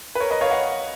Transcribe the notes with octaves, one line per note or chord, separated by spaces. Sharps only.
B4
A#4 C#5
B4 D#5
C#5 F5
D#5 F#5